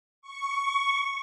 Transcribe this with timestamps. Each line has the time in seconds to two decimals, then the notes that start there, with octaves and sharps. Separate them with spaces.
0.22 C#6